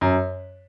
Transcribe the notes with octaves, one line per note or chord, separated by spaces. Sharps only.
F#2